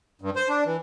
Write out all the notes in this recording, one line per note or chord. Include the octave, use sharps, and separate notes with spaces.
G2
C5
D4
E3